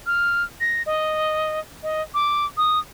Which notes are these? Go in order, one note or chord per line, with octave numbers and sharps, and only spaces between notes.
F6
A#6
D#5
D#5
D6
D#6